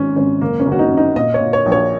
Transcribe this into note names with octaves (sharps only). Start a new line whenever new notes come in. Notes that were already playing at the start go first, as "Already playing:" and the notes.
Already playing: G#1 G#2 C#4
G#1 C#4
F#1 A#3
C#4
F#1
F#4
D#4
F#2
D#4
A#2 D#5
C#5
A#2
C#5
A#1
C#5